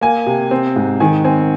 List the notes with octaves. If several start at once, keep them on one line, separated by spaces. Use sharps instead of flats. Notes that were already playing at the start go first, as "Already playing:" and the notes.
A#3 G#5
C3
C4
G#2
D#3 G#5
C4 G#5